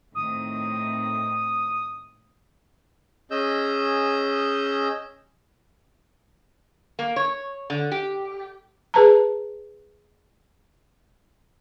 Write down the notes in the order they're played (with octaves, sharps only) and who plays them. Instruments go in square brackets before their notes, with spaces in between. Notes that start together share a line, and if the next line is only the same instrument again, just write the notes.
[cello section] A2 D#3 C4 [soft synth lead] D#6
[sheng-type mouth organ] C#4 G#4 D#5 E6 G6
[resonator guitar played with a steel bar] A#3
C#5
D3
G4
[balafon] G#4 B4 A5 A#5